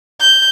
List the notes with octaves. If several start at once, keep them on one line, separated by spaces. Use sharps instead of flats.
G6